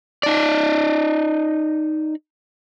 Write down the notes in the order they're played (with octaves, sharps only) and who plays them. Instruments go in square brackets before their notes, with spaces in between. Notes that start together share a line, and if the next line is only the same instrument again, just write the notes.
[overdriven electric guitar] D#4 D5